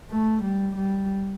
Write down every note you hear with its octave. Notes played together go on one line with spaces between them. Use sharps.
A3
G3
G3